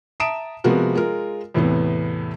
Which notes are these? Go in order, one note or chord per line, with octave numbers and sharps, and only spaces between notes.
E5 A5 A#5 D#6 D7 E7
C3 F3 G#3 B3 F#4 A#4
G#3 F4 A#4
E2 A2 C3 E3 B3